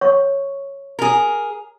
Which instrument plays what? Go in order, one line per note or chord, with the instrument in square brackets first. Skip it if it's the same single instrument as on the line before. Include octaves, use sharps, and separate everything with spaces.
[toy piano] C#5 C#6
[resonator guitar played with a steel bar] G#4 A#4